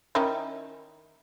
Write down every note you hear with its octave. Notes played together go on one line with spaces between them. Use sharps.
D#3 C#4 E4